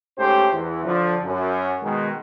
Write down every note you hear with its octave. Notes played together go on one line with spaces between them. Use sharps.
G#2 A3 C#4 G4 C5
E2 E3
D3 F3
F#2
B2 D#3 G#3